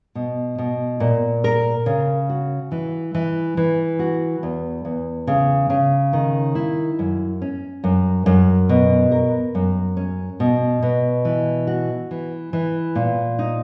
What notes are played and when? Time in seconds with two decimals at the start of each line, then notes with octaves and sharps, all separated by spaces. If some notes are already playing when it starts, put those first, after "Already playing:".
0.15 B2
0.58 B2
1.00 A#2
1.44 A#4
1.86 C#3
2.30 F#4
2.72 E3
3.15 E3
3.57 E3
3.99 F#4
4.43 E2
4.85 E2
5.27 C#3
5.70 C#3
6.13 D#3
6.55 E4
6.99 F#2
7.42 C#4
7.84 F#2
8.26 F#2
8.69 B2
9.12 A#4
9.55 F#2
9.97 C#4
10.40 B2
10.82 B2
11.25 E3
11.67 F#4
12.11 E3
12.53 E3
12.95 A#2
13.39 D#4